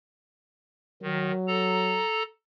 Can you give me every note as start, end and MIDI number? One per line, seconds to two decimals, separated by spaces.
1.02 1.31 51
1.02 2.01 54
1.48 2.23 69
1.48 2.23 82